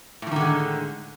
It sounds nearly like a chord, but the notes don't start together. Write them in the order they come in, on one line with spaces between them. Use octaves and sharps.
A2 F3 D#3 D3 G#3